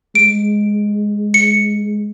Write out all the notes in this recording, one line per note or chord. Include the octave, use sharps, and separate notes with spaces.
G#3 D7
C#7